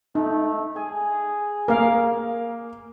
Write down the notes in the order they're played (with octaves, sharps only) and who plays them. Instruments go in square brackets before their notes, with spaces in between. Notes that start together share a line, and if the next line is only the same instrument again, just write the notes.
[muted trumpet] A3 [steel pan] D#4
[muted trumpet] G#4 [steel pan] G#5
[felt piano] A#3 [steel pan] A#4 F5